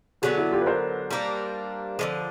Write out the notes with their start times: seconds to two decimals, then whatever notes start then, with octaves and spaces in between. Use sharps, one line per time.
0.22 D3 F#3 B3 F#4 G#4
0.37 E4 F#4
0.52 F4 G4
0.61 B4
0.66 A#4 C5
1.11 G3 A#3 D4
1.99 D3 F3 G#3